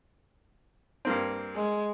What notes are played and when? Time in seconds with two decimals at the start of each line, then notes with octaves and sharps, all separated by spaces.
1.05 G2 A#3 C4
1.56 G#3